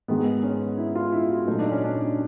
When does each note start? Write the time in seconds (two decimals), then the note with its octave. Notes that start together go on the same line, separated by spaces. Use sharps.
0.08 G#2 D#3 G#3 B3
0.43 C#4
0.77 E4
0.95 F4
1.12 E4
1.30 F#4
1.47 A#2 F#3 A3 D#4
1.59 D4
1.71 C#4
1.84 D4